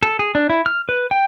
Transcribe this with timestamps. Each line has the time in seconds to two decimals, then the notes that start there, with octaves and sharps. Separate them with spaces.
0.03 A4
0.19 G#4
0.35 D4
0.50 E4
0.66 F6
0.89 B4
1.11 G5